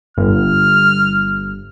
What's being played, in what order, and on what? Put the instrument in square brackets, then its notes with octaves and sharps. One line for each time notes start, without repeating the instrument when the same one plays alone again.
[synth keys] G1 [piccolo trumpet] F6